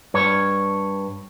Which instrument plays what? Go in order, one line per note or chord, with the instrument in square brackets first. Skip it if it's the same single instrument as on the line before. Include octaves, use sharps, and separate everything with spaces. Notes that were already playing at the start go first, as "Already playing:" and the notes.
[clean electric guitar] G2 C#5